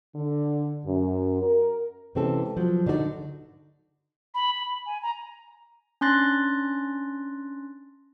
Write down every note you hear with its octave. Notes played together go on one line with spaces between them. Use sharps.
D3
F#2
A#4
C3 E3 G#3 C4 C#4 A4
F3 F#3
D3 D#4 F#4 A4 D5
B5
B5
G#5
A#5
C#4 D4 C6 F#6 A6 A#6